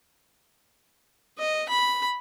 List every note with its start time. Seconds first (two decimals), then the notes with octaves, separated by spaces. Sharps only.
1.38 D#5
1.69 B5